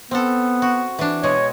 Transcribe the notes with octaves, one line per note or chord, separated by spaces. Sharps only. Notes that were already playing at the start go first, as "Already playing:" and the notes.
B3 C4 A4
F#4
E3 D4
B2 G#3 C#5 D#5